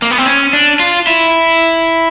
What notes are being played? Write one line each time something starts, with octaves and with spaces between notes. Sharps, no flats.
A#3
B3
C4
C#4
D4
F4
E4